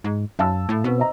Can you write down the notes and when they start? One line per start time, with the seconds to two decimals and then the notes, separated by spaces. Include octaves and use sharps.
0.04 G#2
0.39 F#2 F5 A5 E6
0.69 A2
0.84 B2 C4 B4
0.98 C5 D#5 A#5